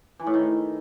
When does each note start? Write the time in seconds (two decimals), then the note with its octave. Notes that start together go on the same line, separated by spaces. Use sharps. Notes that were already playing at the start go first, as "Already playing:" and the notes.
0.20 E3
0.27 A2
0.34 D#3